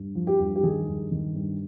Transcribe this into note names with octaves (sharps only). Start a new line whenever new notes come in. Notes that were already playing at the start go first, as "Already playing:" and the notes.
Already playing: G2
F3
G4
G2
G4
D#3 G#4
G2
D#3
G2